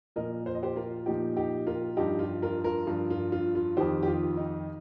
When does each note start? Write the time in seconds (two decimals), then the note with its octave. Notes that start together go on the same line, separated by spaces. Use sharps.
0.16 A#2 F3 A#4 D#5
0.46 C5
0.55 D#5
0.63 G4 C5
0.76 F4 A#4
1.06 A#2 F3 D#4 G4
1.36 D#4 G4
1.67 F4 A#4
1.97 G2 F3 D#4 G4
2.19 F4
2.42 F4 A#4
2.64 F4 A#4
2.87 G2 F3 F4
3.10 F4
3.32 F4
3.55 F4
3.77 F2 D#3 G4 C5
4.03 G4
4.08 F4
4.37 D#4